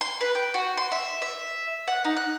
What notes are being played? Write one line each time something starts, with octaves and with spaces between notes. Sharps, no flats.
C6
B4
G5
F#4
C6
E5
E5
F#5
D#4
F#6